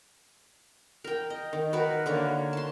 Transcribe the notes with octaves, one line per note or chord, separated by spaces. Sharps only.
A#4 G5
D#5
D#3
F#4 A#4 B4
D3 A#3 C#5
A5 C6